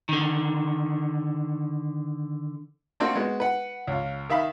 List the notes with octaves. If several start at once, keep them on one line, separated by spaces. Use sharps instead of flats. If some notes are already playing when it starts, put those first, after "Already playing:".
D3 D#3
A3 A#3 C4 D4 F#4
G#3 B3 F#4
B4 F#5
C#2 F4
D#3 E5 F5 B5